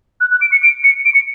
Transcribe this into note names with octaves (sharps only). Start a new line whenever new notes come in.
F#6
F#6
D7
C#7
D7
C#7
D7
C#7